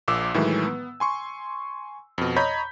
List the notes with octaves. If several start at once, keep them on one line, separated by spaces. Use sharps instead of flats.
A#1 A#2 D6 E6
A2 D#3 E3 F#3 G#3 A3
B3
G#5 C6 C#6
F2 B2
C#5 D#5 A#5 B5 G6 B6